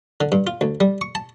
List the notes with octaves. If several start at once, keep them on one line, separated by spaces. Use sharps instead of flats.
D3
G2
F4
D2
G3
C#6
A5